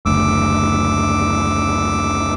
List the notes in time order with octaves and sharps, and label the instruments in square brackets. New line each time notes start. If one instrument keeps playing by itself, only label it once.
[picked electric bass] F#1 D2 [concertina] D6 E6